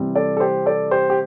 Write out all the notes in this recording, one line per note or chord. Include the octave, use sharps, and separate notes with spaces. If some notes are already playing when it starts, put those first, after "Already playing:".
Already playing: C3 E3 G3 C4
A4 D5
A4
G4 C5
A4 D5
G4 C5
G4